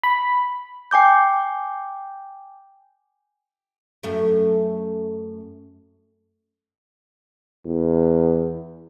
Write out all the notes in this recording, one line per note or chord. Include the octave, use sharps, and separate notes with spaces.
B5
G5 G#5 D6 G6
F#2 A3
E2